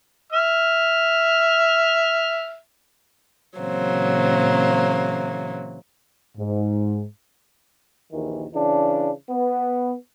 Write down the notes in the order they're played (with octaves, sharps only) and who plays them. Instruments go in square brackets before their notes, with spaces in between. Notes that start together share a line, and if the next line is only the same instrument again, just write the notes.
[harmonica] E5 F6
[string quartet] A#2 C#3 E3 F#3 A#3 C4
[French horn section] G#2
[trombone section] A#1 D#2 D#3 E3
C#3 E3 D4
B3